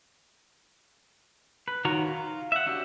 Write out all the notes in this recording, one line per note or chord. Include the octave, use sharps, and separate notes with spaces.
B4
D#3 F4 F#4 C#5 A#5
F4
E5 F#5
C#4 D4 F#4 G4